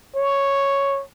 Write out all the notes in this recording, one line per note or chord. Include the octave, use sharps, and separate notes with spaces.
C#5